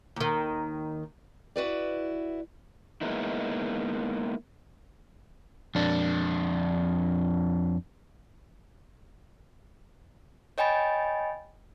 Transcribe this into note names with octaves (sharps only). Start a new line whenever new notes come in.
D#2 D#3
E4 F#4 B4 D5
G#3 A#3 B3 D#4 E4
F2 D4
C#5 D#5 G5 G#5 B5 A6